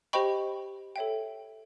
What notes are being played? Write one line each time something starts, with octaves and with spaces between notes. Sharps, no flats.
G4 C5 D#5 G5 B5 C#6
A4 C#5 E5 G5